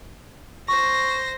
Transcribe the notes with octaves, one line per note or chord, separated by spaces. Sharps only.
C5 C#6 A#6